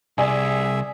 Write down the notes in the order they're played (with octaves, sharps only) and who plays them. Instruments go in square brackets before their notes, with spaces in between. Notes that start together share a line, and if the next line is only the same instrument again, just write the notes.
[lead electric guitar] C2 [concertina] G#4 E5 [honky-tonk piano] D5 G#5